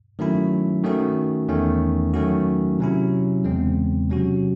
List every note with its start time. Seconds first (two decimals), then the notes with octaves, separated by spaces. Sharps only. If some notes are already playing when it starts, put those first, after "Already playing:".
0.19 D#3 F#3 A3 C#4 E4
0.84 D#3 A3 C#4 F#4
1.48 E2 D#3 A3 C#4
2.14 D#3 F#3 A3 C#4 F#4
2.79 C3 F#3 C#4 E4
3.44 E2 C#3 G#3 C4
4.09 C3 F#3 C#4 F#4